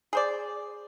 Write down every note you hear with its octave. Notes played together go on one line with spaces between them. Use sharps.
G#4 C5 D5